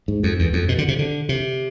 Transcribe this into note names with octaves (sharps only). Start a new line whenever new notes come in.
G#2
F2
E2
F2
B2
D3
C3
D3
C3